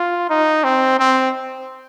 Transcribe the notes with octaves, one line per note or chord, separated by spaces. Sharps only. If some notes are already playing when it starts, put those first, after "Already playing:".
Already playing: F4
D#4
C4
C4